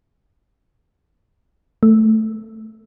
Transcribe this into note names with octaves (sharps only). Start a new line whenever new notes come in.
A3